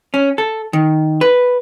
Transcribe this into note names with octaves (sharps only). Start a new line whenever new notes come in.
C#4
A4
D#3
B4